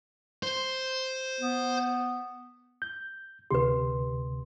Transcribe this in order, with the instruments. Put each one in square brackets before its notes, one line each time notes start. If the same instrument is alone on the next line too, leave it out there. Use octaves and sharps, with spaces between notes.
[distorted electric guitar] C5
[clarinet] B3
[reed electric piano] G6
[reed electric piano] D2 C3 C6 [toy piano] G4 B4